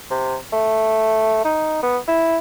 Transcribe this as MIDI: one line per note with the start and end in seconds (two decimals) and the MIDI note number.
0.11 0.37 48
0.53 1.41 57
1.44 1.80 63
1.83 1.98 59
2.08 2.39 64